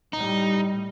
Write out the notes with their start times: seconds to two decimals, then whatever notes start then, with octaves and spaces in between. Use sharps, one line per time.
0.13 A2 G3 D#4